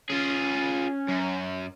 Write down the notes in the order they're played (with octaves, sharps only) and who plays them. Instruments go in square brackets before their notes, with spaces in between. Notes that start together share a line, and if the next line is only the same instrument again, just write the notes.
[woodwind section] C#4 [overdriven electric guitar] F4 G#4
[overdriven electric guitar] F#2